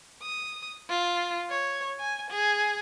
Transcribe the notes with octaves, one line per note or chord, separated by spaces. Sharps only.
D#6
F4
C#5
G#5
G#4